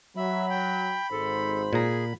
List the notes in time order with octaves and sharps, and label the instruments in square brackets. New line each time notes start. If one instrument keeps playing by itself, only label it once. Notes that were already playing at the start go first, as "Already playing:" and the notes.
[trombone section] F#3 [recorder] E5 [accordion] B5
[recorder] G5
[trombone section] G#1 G#2 C5 [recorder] A4
[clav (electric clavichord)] A#2 A#5 [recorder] G#4